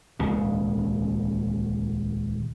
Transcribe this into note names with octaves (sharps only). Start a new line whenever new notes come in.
D#1 C#2 C#3